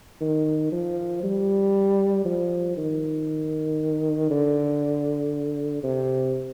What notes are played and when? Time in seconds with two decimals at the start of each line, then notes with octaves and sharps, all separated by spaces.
0.21 D#3
0.72 F3
1.23 G3
2.25 F3
2.77 D#3
4.30 D3
5.83 C3